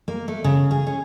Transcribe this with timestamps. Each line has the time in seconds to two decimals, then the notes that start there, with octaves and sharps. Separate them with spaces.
0.08 A#3
0.28 A3
0.44 C#3
0.71 G#4
0.87 C#4